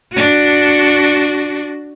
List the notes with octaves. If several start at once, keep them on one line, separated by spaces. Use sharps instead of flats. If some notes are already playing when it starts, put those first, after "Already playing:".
D4 F#4